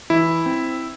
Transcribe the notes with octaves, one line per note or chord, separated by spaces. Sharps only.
E3 E4
C4